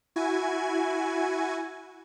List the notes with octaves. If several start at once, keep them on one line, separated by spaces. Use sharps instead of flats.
E4 F#4 G#5 G#6